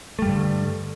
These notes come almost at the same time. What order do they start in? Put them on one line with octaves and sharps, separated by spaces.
A3 G3 G2 D3